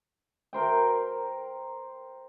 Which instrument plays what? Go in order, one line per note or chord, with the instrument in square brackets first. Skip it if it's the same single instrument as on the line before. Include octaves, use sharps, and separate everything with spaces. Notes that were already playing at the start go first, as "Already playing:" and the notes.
[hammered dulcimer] A#4 C5 G5